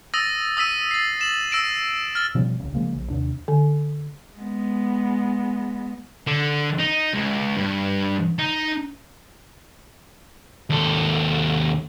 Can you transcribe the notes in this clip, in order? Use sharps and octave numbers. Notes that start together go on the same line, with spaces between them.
D#6 E6 A6 A#6 D#7
D#6 E6 B6 D#7
A6 C7
E7 F#7
E6 A#6 D7 E7
F6 A6
B2 F3 G3 C#4
D1 C2 C#3
C#3 F3 G#3 A#3
A#1
D#2 C3 D4
D3
G#3 B3
D3
D#4
C#2
G2
D#4
D#2 A4